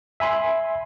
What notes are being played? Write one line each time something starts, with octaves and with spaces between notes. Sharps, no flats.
E5 G#5 B5 C6